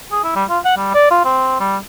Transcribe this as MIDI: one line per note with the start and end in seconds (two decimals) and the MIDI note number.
0.12 0.20 68
0.24 0.34 64
0.36 0.44 55
0.50 0.59 65
0.65 0.77 78
0.77 0.90 55
0.94 1.06 74
1.11 1.21 65
1.25 1.57 60
1.60 1.77 55